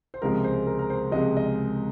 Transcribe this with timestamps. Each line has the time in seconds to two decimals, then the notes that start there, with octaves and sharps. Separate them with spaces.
0.14 C5
0.22 C#2 C3 F3 G#3 A#4
0.44 C5
0.67 A#4
0.79 A#4
0.90 C5
1.11 C#2 C3 F3 G#3 D#5
1.37 D#5